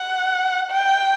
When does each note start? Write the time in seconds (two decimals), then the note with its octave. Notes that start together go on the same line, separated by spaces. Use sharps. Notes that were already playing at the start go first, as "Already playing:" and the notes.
Already playing: F#5
0.71 G5